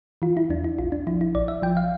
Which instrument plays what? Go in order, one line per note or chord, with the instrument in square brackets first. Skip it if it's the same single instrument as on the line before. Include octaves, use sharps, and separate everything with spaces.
[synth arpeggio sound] E3 F4
E4
E2 D4
E4
A#1 F4
D4
F3 E4
E4
A#1 D5
E5
F3 G5
F5